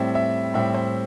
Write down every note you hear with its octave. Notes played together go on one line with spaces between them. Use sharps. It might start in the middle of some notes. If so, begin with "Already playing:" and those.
Already playing: A2 G3 C4 E5
E5
A2 G3 C4 E5
C5